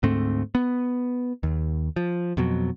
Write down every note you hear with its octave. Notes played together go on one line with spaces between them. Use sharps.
D2 G#2 A3 C4
B3
D#2
F3
F2 B2 F#3